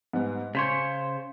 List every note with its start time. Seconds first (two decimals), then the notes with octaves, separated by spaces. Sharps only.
0.13 G#2 G3 B3
0.55 C#3 C5 C#5 B6